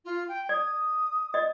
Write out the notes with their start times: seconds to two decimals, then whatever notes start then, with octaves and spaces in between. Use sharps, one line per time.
0.04 F4
0.28 G5
0.49 D5 D#6
1.34 D5 D#5